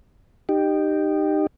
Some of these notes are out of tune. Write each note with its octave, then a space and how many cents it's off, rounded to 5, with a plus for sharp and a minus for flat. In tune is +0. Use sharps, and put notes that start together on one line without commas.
D#4 -25 G4 +0